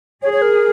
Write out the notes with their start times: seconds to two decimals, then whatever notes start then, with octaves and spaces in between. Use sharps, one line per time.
0.23 G#4 C#5
0.33 C#5
0.42 A#4